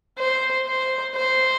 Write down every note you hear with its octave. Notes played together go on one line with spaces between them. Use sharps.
C5
C5
C5